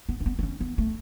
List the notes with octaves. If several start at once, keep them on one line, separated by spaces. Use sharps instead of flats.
B3
C#4
B3
B3
C#4
B3
A3